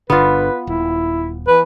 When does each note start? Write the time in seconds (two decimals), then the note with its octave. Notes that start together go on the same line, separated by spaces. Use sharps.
0.10 G1 D3 B3 F4 B4
0.67 D#1 E4
1.47 E3 B4